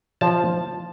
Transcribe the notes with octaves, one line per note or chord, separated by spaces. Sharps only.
F3 A5